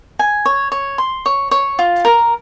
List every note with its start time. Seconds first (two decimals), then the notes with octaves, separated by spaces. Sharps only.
0.19 G#5
0.46 C#5
0.72 C#5
0.98 C6
1.26 C#5
1.51 C#5
1.79 F4
2.05 A#4